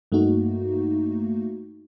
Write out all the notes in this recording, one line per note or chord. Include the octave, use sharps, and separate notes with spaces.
G2 A3 A#3 D#4 F#4